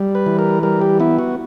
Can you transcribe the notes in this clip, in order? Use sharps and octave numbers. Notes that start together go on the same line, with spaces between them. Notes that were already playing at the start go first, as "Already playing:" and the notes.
Already playing: G3
B4
E3
A#4
G3 A#4
G4
B3 E4
F#4